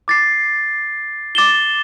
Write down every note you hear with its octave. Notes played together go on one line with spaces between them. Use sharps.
D6 A6 C7
D6 A6 E7 G7